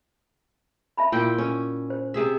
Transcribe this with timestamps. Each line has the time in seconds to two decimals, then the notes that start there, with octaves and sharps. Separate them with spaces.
0.97 E5 A5 B5
1.12 A#2 E4 G5
1.38 C#4
1.90 C5
2.14 C3 G#4 E5